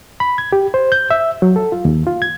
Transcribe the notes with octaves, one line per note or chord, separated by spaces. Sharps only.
B5
G#6
G4
C5
G6
E5
F#3
A4
F4
D#2
F4
G#6